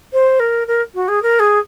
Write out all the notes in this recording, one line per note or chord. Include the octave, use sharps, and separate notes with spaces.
C5
A#4
A#4
F#4
G#4
A#4
G#4